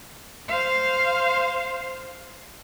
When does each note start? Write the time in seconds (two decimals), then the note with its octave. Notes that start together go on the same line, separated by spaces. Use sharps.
0.49 C5 F5